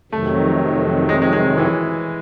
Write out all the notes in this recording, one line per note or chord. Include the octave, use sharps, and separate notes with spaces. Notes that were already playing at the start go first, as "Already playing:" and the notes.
F2 C3 D#3 F#3 A3
G#3
G#3
G#3
E3